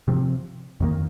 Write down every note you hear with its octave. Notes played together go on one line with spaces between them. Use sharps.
C3 F3 C4
F2 D#3 A#3